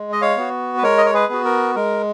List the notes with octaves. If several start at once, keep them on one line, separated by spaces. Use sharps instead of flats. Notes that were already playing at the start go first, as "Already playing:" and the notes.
Already playing: G#3
D#5
C#5 F5
B3 F#4
B4
G#3 A#4 C#5
D#5
C#5
G#4 B4
B3 F#4
A#4
G#3 A#4